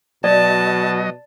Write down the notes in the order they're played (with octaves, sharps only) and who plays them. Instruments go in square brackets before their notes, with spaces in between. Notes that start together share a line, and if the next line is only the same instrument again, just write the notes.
[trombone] B2 [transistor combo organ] F#3 D#5 [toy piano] D5 [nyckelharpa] A5